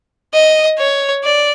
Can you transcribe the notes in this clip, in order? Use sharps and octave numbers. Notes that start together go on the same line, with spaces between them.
D#5
C#5
D5